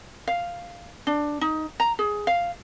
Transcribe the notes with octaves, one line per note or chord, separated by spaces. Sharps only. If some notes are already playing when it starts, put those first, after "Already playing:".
F5
D4
D#4
A#5
G#4
F5